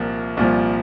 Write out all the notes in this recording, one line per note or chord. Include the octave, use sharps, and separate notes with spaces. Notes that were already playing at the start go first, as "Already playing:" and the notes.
Already playing: C2 A#2 F3 A#3
C2 A#2 F3